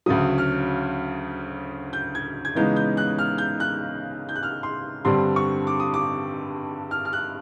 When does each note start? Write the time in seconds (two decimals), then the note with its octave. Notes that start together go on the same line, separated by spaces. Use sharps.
0.06 D2 C#3 F#3 D#6
0.38 F6
1.93 G6
2.15 G#6
2.45 G#6
2.55 C#3 E3 G#3 B3 D#4 G6
2.76 G6
2.97 F#6
3.19 F6
3.38 G6
3.60 F#6
4.29 G6
4.36 F#6
4.43 F6
4.63 C6
5.05 G2 D3 G3 C4 C6
5.36 C#6
5.67 D6
5.80 D#6
5.94 D6
6.91 F6
7.05 F6
7.13 F#6